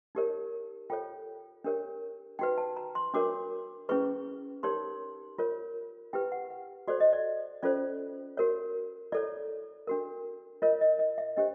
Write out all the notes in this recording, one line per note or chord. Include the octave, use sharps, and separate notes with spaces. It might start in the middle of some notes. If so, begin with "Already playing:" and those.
D#4 G4 A#4 C#5
F4 A4 C#5 G5
D4 G4 A#4 C#5
D#4 F#4 B4 G5
A5
A#5
C6
D4 F#4 A#4 C#5 D6
C#4 E4 G#4 B4 C#6
D#4 G4 A#4 C#5 C6
F4 A#4 C#5
E4 G4 B4 G5
F#5
F#5
F#4 A4 C5 D5
D#5
D5
C#4 F4 A4 C5 D5
F#4 A#4 C#5
E4 A4 C#5 D5
D4 F#4 A#4
F4 A#4 C#5 D#5
D#5
D#5
E5
D4 G4 C5 D#5